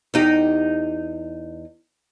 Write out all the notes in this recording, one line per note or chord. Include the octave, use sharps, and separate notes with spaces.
E2 D#4 G4